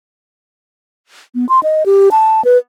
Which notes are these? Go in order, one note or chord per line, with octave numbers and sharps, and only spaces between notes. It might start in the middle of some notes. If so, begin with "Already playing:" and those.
B3
C6
D#5
G4
A5
B4